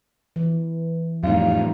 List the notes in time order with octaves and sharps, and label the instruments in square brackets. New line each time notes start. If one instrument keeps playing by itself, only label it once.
[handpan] E3
[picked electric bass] F2 A2 [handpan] G3 D#4 [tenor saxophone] F4